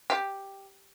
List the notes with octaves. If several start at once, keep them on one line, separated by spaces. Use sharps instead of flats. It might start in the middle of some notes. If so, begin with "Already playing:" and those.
G4